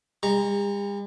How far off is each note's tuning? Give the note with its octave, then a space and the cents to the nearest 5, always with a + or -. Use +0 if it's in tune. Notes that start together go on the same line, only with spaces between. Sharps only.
G3 +45 A#5 +0